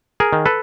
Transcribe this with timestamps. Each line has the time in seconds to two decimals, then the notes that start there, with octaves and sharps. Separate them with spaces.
0.20 G#4 A#4
0.33 D#3
0.46 A4 B4